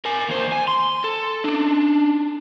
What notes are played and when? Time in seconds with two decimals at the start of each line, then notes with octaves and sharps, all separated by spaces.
0.05 A#4 G#5
0.29 D#2 C5
0.52 G#5
0.68 C6
1.04 A4
1.44 D4 D#4